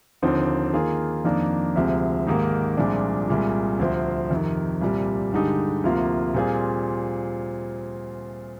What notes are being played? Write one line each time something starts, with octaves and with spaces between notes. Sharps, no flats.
D#2 D3 F3 C4 D#4
D#3 A#3 F4 G#4
F2 D#3 A#3 D4
D2 C3 F3 G#3
G#2 D#3 A#3 D#4 G4
C2 A#2 F3 G#3 D4
C2 A#2 G#3
D2 C3 F3 C4
F2 C3 D#3
C2 A#2 G3
G2 D3 G#3 D#4 G4
D2 C3 F3 A#3 F4
A#2 G3 C4 F4 G#4